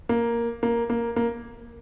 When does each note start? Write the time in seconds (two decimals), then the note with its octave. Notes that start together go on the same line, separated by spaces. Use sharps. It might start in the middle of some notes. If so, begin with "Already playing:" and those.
0.09 A#3
0.63 A#3
0.90 A#3
1.16 A#3